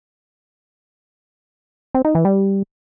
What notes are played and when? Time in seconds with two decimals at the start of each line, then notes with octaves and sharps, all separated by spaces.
1.95 C4
2.05 D#4
2.15 E3
2.25 G3